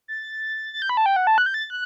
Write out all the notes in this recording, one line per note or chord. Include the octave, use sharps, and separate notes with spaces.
A6
A6
G6
B5
A5
G5
F#5
A5
F#6
G6
A6
F#6